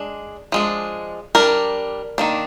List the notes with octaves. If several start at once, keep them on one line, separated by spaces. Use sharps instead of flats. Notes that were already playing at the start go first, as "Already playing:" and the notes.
Already playing: G#3 D4
F3 G#3 D4
G3 D4 A#4
D#3 A#3 D4